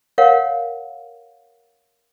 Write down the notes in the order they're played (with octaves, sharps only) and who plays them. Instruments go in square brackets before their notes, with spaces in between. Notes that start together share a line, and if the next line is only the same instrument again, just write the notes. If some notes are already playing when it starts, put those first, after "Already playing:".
[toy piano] A#4 C#5 F5 F#5